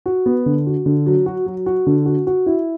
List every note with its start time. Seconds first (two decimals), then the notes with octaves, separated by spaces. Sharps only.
0.06 F#4
0.26 B3
0.46 D3
0.66 F#4
0.86 D3
1.06 F#3
1.26 F#4
1.46 F#3
1.66 F#4
1.87 D3
2.06 F#4
2.27 F#4
2.46 E4